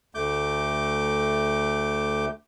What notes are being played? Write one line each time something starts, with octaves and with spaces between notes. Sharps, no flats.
D2 A3 D6 G6